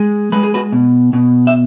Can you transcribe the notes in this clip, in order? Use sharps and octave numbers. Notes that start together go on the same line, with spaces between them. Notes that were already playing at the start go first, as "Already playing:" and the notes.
Already playing: G#3
G#3 B4
G#4
F#4 B4
B2
B2
E5